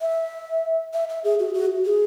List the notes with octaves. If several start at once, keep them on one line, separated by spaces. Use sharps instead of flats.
E5
E5
E5
G#4
F#4
F#4
G#4